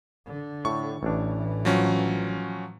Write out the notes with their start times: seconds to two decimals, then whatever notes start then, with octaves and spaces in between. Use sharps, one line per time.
0.26 D3
0.65 A2 C#6
1.03 A1 A2 E3 D4
1.65 F3 F#3 C#4